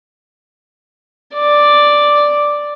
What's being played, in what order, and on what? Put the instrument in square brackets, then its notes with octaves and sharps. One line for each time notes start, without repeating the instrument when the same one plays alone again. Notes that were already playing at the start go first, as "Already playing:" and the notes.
[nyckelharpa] D5